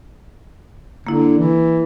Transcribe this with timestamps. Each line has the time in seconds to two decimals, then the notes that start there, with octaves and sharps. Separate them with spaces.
1.07 D3 A#3 E4
1.38 E3